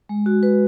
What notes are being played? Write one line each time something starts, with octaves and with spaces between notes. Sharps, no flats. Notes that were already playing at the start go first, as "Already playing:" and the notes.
G#3
F#4
B4